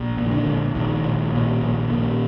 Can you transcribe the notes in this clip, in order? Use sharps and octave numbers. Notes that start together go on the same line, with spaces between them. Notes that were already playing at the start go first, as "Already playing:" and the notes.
Already playing: A#1
A#2
D#3
D3
A#1
A#1 D#3
A#1
A#2
A#1
A#2